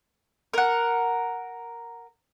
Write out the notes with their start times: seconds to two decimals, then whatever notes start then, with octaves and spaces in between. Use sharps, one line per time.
0.54 A#4 F#5